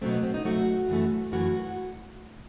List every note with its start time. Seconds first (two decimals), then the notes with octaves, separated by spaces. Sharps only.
0.02 B2 F#3 A3 C4
0.12 B3
0.23 C4
0.34 D#4
0.45 B2 F#3 A3 F#4
0.89 F#2 E3 A3
1.32 F#2 E3 A3 F#4